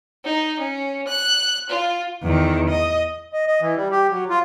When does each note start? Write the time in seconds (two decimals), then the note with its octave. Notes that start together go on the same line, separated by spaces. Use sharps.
0.24 D#4
0.59 C#4
1.06 F#6
1.69 F4
2.23 E2 D#3
2.70 D#5
3.33 D#5
3.47 D#5
3.61 E3
3.76 G3
3.91 G4
4.11 F#3
4.30 F4